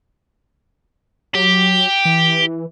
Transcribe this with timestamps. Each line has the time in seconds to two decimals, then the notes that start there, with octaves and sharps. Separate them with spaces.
1.35 F#3 G4
2.05 E3